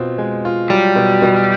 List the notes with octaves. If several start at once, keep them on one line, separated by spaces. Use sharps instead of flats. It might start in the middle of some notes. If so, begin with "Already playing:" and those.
Already playing: B2 C4 F4
G#3
F4
F#3 G3
B2
B2